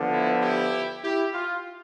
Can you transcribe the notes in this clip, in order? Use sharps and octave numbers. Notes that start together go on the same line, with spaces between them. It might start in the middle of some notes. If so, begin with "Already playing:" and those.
Already playing: D3 F3 B3
E4
E4 G4
E4 G4
F4